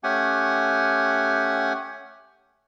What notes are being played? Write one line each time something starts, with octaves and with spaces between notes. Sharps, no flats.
A3 C#4 G4 F#5 G#5